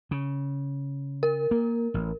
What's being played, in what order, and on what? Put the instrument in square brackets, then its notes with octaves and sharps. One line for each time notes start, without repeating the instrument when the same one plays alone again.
[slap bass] C#3
[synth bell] A#4
[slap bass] A#3
A1